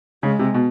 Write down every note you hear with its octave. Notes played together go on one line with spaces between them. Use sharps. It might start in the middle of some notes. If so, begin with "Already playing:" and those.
C#3 G#3
C3
B2